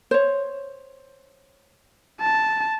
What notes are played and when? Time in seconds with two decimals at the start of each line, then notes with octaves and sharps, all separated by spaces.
0.11 C5 C#5
2.21 A5